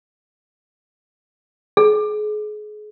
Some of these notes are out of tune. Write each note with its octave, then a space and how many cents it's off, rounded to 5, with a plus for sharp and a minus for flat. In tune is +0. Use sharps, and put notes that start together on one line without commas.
G#4 +30